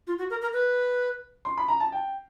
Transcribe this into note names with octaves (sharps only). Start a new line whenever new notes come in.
F4
F#4
A#4
A#4
B4
C6
B5
A#5
A5
G5